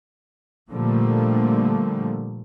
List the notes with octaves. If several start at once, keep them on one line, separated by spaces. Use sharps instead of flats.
A#2 D3 F3 G3 A3 A#3